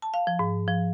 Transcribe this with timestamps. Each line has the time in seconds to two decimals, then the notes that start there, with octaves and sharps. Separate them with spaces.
0.02 A5
0.14 F5
0.27 F3
0.39 G#2
0.68 F3